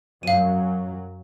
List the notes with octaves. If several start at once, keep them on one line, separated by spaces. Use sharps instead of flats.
F#2 F#3 F5 D#7